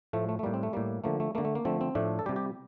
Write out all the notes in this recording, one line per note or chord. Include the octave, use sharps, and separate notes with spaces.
A2 F3 A3
A3
A3
A2 G3 A#3
C4
A3
A2 G3 A#3
D3 F3 A3 A#3
A3
D3 A3 A#3
A3
A#3
D3 F3 A3 C4
C4
A2 F3 A3 D4
A4
C3 G3 G4
G4